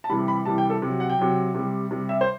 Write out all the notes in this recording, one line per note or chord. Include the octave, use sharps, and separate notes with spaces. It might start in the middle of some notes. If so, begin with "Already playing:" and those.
A5
C3 E3 G3 B5
B5
C3 E3 G3 A5
G5
A4
C3 F#3
F#5
G5
C3 F#3
C3 G3
C3 G3
E5
C5